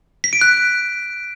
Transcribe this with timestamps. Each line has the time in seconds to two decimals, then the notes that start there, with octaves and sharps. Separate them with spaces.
0.24 B6
0.33 D7
0.41 F#6